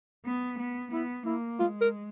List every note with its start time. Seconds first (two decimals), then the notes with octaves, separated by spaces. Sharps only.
0.25 B3
0.59 B3
0.92 B3 E4
1.26 A#3 E4
1.59 G#3 F4
1.81 A#4